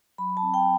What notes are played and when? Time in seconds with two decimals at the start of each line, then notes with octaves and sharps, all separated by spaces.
0.18 F#3 B5
0.37 A5
0.42 C4
0.54 G5